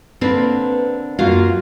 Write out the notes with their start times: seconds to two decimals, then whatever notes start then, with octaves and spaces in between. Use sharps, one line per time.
0.21 D3 A#3 C4 D4 B4
1.19 F#2 A#3 F4 F#4 F5